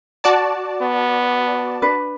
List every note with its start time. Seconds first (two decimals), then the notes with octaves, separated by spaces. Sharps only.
0.24 F#4 D5 A5
0.82 B3
1.82 D4 B4